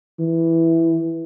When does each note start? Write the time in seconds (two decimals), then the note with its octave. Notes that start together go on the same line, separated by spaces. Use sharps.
0.20 E3